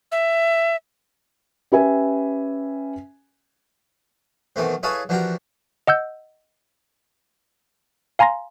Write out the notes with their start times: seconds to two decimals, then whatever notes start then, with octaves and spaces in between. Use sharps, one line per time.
0.12 E5
1.72 C#4 G4 B4 E5 G#5
4.56 B2 D#3 E3 A3 C4
4.83 E4 G#4 A4 B4 C#5 F5
5.09 E3 F3 D4 F#4 G4 A#4
5.87 D#5 F#5 E6 G6
8.19 F5 G#5 A#5 C6 A#6